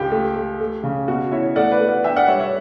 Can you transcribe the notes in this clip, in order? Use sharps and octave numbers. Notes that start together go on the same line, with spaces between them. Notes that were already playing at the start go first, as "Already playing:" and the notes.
Already playing: C#2 G4
A3
A3
A3
C#3
B2 F#4
E4 C#5 E5
A3 D5 F#5
B4 D5
A3
D5 F#5
D4 E5 G5
D5 F#5
G3 C#5 E5
C#5 E5